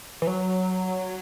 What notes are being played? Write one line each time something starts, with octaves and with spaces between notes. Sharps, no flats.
E3
F#3